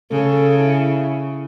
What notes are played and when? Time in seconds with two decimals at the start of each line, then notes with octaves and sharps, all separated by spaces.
0.11 C#3 A4
0.60 E4